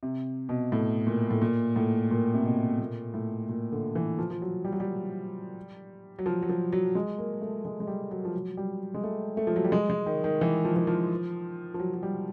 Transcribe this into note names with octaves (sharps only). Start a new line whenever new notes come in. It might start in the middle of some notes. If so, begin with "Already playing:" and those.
C3
B2
A2
A#2
A2
A#2
A2
A#2
C3
B2
A#2
A2
A#2
D3
E3
F3
F3
F#3
G3
F#3
G3
F#3
F3
F#3
F3
F#3
G#3
A#3
A3
G#3
G#3
G3
F#3
F3
F#3
G3
G#3
A3
A3
F3
F#3
G3
G#3
G#3
D#3
D#3
E3
F3
E3
F3
F3
F#3
F#3
G3